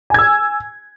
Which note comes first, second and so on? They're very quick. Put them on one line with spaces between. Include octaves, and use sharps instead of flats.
G#5 G#6 E6